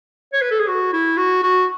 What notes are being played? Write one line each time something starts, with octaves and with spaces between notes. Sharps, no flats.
C#5
B4
A4
G#4
F#4
E4
F#4
F#4